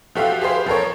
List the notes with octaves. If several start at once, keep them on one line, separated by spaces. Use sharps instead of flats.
F3 A3 F#4 G4 E5 F5
G4 G#4 B4 C5 F5
F3 A4 A#4 C#5